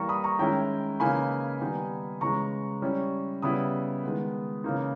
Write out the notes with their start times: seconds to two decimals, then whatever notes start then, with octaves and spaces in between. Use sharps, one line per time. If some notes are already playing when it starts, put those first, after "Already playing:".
Already playing: E3 G3 A#3 A#5 C#6
0.09 B5 D#6
0.24 A#5 C#6
0.39 D#3 G#3 C#4 E4 G5 A#5
1.00 C#3 E3 A#3 D#4 G#5 B5
1.61 D#3 G3 B3 D#4
2.21 C#3 E3 G#3 A#5 C#6
2.82 G3 C#4 E4
3.42 C#3 G3 B3 E4 B5 D#6
4.04 D#3 G#3 B3
4.64 C#3 E3 A#3 D#4